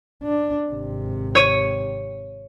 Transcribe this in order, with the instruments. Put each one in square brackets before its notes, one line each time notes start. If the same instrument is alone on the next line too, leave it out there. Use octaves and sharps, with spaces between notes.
[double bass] D4
G#1 C3
[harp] C#5 D#7